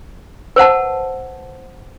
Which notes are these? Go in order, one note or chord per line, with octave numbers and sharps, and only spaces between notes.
B4 C5 F#5 A5